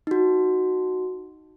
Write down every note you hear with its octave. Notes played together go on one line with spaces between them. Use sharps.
D#4 F#4